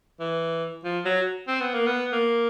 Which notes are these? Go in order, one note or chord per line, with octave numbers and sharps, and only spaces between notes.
E3
F3
F#3
C4
B3
A#3
B3
A#3